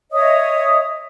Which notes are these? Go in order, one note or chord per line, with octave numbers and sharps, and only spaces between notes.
C#5 D#5 E5 D#6